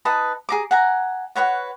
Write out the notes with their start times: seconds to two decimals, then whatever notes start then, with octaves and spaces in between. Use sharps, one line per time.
0.05 D#4 B4 A5 D#6
0.49 G#4 A#5 D6
0.71 F#5 G#5 A#5
1.35 F#4 B4 C#5 F#5